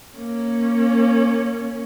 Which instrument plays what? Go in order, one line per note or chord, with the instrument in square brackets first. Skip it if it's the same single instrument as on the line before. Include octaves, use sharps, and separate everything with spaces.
[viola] A#3 C#4